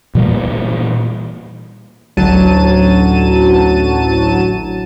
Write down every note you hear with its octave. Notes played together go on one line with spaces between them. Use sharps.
A#2 E3 G3 A#3
A1 D2 F#3 A5 D#7